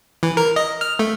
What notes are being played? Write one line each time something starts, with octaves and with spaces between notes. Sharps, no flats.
E3
A#4
D#5
F6
A3